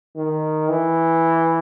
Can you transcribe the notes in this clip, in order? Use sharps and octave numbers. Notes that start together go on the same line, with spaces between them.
D#3
E3